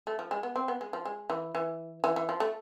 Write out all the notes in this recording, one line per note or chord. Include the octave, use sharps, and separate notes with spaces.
A3
F3
G#3
B3
C4
B3
G#3
F3
G#3
E3
E3
E3
E3
F3
A3